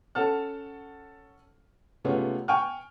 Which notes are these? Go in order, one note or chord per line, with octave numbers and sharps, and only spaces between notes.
C#4 A4 F#5 A5 F6
C3 G#3 A3 B3 C#4 F4
G5 G#5 C#6 F6